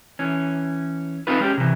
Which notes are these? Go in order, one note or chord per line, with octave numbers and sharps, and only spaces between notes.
E3 C#4
C4 D#4 F4 B4
G#3 C#4 G4
C3 E3